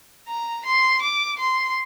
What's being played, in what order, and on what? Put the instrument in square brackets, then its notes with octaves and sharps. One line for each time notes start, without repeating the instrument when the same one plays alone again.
[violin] A#5
C6
D6
C6